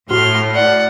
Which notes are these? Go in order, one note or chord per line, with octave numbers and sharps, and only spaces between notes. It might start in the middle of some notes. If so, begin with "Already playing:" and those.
A2 F#4 C6 F6
D5 F#5